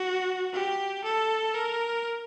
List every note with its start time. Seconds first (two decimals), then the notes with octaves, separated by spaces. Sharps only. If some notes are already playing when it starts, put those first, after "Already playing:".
Already playing: F#4
0.53 G4
1.04 A4
1.55 A#4